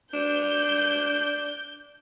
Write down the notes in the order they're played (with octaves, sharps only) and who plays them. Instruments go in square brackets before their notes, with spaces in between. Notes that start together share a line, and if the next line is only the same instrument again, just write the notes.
[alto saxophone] D4 [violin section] G6